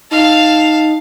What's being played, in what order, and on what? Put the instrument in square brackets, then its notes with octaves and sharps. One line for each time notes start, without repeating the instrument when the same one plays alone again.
[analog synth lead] D#4 [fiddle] F5 A5